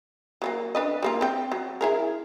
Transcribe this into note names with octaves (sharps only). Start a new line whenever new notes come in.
F#3 G3 A#3
D4 B4 D#5
G3 A#3 F4
C4 G5
F#3
E4 G#4 A#4